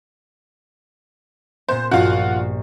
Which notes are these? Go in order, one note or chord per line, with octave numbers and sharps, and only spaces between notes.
A#2 B3 C5
A#1 G2 F4 F#4